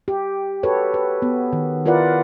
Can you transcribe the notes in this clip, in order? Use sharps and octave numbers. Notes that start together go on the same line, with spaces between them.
G4
F#4 G4 A4 B4 C#5
B4
B3
D#3
E4 F4 A#4 B4 D5 F#5